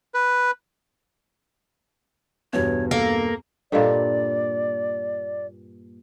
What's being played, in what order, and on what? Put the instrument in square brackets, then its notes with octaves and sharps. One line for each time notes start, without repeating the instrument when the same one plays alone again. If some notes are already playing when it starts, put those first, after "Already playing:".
[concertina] B4
[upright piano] E2 G2 B2 [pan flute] C#5
[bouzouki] A#3 [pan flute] A4
[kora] G2 A#2 [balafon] A4 D#5 F5 [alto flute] D5